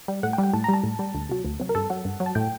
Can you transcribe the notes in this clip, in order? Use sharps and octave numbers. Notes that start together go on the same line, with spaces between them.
G3
A2 F#5
G5
G3
G5
A2 A5
A#5
G3 A5
A2
G3
D2
C3 F#3
D2
C3 F#3
A#4
G2 A4
F#3 F#5
G2
F#3
A5
A2 G5